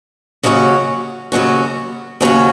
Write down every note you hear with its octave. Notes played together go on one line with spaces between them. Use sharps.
D#2 C#3 F#3 C#4 F#4
D#2 C#3 F#3 C#4 F#4
D#2 C#3 F#3 C#4 F#4